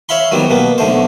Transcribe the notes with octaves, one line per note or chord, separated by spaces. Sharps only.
C#5 E5 F5 B5 C6
D#3 F#3 G3 B3 C4
B2 A#3 B3
B1 D3 A3 C5